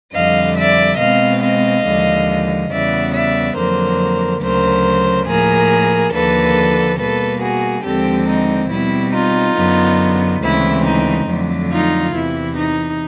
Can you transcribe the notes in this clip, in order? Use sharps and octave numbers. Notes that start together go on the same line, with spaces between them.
F2 D3 G3 D#5 F5
D5 E5
B2 G#3 C4 D#5 F5
D#5 F5
D#2 D3 F3 G#3
E2 C#3 E3 G3 B3 D5 E5
D5 E5
F2 D3 F#3 A#3 A#4 C5
D2 C#3 F#3 A#4 C5
A2 F3 A#3 G#4 A#4
D#2 D3 F3 A#3 A4 B4
B2 G3 A#3 A4 B4
F#4 G#4
D#2 D3 F3 G#3 C4 G4 A4
D#4
B2 G3 C4 E4
D#4 F4
F#2 D3 F#3 B3
D2 C#3 E3 G#3 C4 E4
D#4
F2 D3 F#3 A3
D#4 F4
E2 C3 E3 E4
D#4